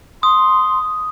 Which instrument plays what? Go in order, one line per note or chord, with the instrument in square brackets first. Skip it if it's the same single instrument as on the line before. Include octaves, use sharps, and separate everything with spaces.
[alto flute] C6 [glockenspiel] D#6